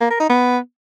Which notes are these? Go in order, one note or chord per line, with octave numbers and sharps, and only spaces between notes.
A#3
A#4
D#4
B3